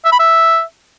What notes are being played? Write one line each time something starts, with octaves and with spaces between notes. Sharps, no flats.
E5
B5
E5